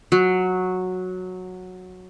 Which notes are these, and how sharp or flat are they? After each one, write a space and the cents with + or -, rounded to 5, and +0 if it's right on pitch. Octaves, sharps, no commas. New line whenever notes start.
F#3 -10